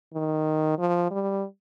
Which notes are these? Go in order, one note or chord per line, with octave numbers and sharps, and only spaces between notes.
D#3
F3
G3